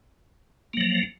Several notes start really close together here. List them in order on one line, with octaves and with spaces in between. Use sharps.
A#3 F#3 F3